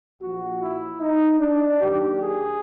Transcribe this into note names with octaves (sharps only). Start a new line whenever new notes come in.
A#1 A#2 F3 F#4
E4
D#4
D4
D#2 D#3 F#3 G4
G#4